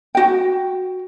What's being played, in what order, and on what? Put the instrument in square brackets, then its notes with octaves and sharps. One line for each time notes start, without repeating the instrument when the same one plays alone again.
[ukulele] F#4 G5